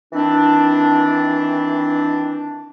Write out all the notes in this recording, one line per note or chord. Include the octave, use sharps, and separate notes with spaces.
D#3 E3 C4 D4